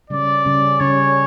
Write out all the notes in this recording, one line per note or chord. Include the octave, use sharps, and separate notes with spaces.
C#3 G3 C#4 D5
C#3 G3 C#4
C#3 G3 C#4 C#5